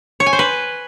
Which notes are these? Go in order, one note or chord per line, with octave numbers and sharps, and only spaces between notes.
C#5
G#5
C5
B4